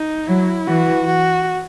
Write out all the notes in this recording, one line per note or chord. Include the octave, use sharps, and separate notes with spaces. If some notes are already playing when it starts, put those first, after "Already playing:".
Already playing: D#4
F#3 E4
E3 F#4
F#4